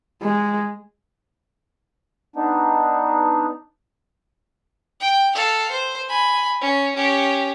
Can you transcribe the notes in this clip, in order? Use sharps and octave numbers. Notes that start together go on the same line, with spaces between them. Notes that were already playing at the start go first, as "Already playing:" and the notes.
G#3
B3 D4 D#4
G5
A4 F5
C5
G#5 B5
C#4
C#4 G4